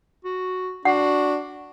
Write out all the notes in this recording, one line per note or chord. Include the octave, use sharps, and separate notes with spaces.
F#4
D4 F#4 F#5